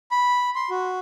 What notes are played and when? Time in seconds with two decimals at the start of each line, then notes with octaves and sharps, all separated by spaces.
0.11 B5
0.55 C6
0.70 F#4